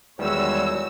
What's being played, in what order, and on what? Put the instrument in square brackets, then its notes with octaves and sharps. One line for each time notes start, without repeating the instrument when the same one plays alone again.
[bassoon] E2 [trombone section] D#3 G3 G#3 [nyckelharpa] F#4 C#5 [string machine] E6